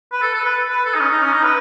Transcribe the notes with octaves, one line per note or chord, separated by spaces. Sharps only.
B4
A4
A4
B4
B4
A4
D#4
C#4
D#4
C#4
D#4
B4